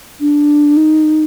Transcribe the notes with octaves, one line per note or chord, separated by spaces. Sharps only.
D4
D#4